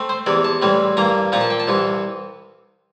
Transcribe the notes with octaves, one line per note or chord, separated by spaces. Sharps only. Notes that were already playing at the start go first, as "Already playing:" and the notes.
Already playing: A3 C4
C5
E2 C3 E3 D5
A5
A2 E3 G3 C4
G2 E3 A#3 A#5
A#2 F3 C4 A#5
A5
G5
A5
C2 C3 E3